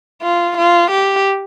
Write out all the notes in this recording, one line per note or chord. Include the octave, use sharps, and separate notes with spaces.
F4
F4
G4